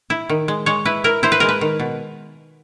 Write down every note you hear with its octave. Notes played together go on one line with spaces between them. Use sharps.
E4
D#3
G#3
G#3 C#5
E4 B4
E4 A#4
E4 C5
B4
G#3 A#4
B4
D#3
B2